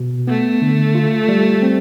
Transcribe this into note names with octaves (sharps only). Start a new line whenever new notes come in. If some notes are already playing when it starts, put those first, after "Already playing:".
Already playing: B2
A3 B3
D3
F4
G3
C4